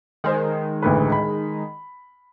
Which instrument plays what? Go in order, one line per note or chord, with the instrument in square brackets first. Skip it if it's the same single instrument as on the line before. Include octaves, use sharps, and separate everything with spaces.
[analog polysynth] D#3 G#3 [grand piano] G#4 C5
[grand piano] A1 D2 B4
B5